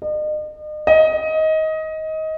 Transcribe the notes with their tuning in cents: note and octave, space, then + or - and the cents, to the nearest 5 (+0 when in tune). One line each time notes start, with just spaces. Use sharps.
D#5 -40
D#5 +20